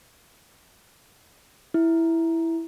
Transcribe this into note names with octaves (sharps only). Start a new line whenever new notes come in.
E4